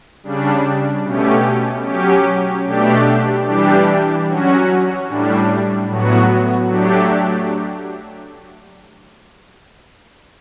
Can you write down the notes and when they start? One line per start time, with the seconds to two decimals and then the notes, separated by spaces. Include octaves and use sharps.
0.23 C#3 G3 D4
1.04 B2 A3 C#4 G4
1.85 F#3 C#4 G4
2.66 B2 A3 D4 G4
3.47 E3 G3 D4 G4
4.28 F#3 C#4 F#4
5.08 A2 G3 D4
5.90 A2 F#3 B3 F#4
6.70 F#3 A3 D4 G4